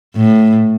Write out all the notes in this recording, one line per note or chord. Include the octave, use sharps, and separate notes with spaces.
A2